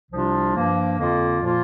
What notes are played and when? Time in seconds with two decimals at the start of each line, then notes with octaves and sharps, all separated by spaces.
0.11 C2 C3 F3 D4 F4
0.55 G2 F3 A#3
0.98 F2 D3 A#3 F4
1.41 A#2 F3 A#3 F4